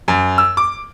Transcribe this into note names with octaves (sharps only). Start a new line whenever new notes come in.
F#2
E6
D6